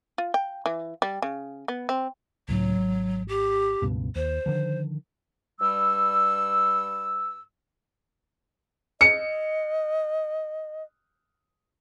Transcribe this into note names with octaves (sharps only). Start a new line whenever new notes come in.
F4
G5
E3
G3
C#3
B3
C4
C#2 A2 F#3
G#1
G4
C#2 G2 B2
D#2 C5
D3 D#3 F3
G2 G3 E6
D#5 C#7